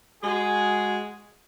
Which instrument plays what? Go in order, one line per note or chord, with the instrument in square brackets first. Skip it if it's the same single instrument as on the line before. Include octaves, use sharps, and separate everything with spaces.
[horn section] G#3 F#4 G#4